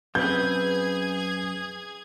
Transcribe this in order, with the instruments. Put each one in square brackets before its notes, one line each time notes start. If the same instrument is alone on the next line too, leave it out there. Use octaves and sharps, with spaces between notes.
[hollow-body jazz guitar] F#2 C4 [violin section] G#4 G#6 [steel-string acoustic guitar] B4 [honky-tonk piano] G6